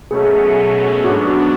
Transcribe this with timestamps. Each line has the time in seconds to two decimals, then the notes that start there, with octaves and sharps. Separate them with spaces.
0.10 B2 F#3 A3 C#4 G#4
1.04 G#2 F#3 B3 D4 F#4
1.27 F#4